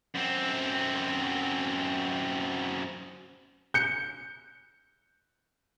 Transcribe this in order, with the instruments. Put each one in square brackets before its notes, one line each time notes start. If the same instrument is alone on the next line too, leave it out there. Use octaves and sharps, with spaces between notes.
[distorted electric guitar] F#2 C4
[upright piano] G6 C#7